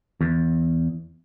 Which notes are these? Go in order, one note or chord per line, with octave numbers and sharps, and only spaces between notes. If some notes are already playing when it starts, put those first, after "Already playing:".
E2